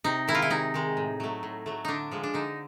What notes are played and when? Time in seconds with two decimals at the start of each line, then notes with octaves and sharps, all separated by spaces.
0.04 C3 D#4
0.28 D#3 G#3 E4
0.35 F4
0.42 E4
0.50 C3 D#4
0.74 D#3 G#3
0.97 A2
1.20 F#3 A3
1.43 A2
1.66 F#3 A3
1.85 D3 D4 D#4
2.12 F3 G#3
2.24 D4
2.34 D3 D#4